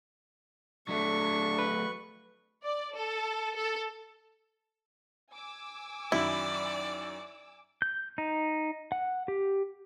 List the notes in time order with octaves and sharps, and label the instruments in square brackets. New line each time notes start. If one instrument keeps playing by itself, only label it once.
[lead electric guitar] F#3 A3 [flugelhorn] D4 [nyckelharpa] C#6
[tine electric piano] B4
[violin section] D5
A4
A4
G#5 D6 E6
[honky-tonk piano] F#2 D#3 B5 [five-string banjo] E4 [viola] D5
[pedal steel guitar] G6
D#4
F#5
G4